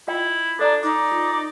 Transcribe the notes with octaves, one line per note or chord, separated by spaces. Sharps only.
E4 F4 D#5 G5
D4 A4 D5 A#5
D#4 D5 D6
F4
D5